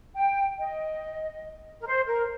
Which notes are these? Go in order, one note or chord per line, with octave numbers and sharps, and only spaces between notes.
G5
D#5
A#4
C5
A#4